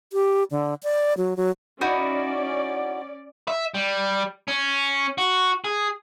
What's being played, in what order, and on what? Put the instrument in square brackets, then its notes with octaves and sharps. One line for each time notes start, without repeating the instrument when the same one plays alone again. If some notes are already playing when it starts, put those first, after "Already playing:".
[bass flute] G4
D3
D5
F#3
F#3
[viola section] C#4 D5 [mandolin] D#4 E4 F#4
[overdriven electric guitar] E5
G3
C#4
F#4
G#4